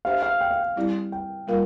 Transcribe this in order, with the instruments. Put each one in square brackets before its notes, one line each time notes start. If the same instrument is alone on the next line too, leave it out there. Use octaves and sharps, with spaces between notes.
[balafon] D4 G4 C5 E5 [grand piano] F5
[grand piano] F5
G5
F5
G5
[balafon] G3 C4 E4 G4 D5
[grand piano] G5
[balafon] G3 A#3 F4 A#4 F5